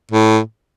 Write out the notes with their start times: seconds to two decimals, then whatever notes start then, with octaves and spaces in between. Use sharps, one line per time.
0.11 A2